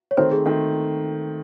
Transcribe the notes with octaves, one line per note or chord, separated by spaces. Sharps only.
C#5
D#3 A3 C4 C5
G#4
D#3 A3 C4